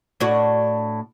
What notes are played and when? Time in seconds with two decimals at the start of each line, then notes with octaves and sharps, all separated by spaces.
0.20 A2 D4 F#4